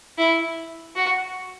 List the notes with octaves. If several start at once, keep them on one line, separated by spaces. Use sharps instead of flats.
E4
F#4